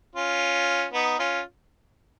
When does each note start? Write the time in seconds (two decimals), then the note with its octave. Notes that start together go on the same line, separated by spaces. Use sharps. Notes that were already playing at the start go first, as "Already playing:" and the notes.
0.15 C#4 F4
0.93 B3 D#4
1.19 C#4 F4